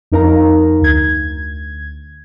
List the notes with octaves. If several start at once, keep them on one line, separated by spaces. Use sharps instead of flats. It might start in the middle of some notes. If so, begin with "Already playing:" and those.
F2 D#4 A#4 F5 A#5
D2 G#6